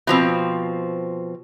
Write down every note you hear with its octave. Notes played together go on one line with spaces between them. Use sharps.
B2 F3 C4